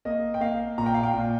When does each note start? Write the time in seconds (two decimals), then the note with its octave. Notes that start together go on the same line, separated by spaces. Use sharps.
0.05 A#3 D#5
0.34 G5
0.41 A#3 F5
0.78 A#2 A#5
0.86 G5
0.94 F5
1.03 G5
1.14 A#2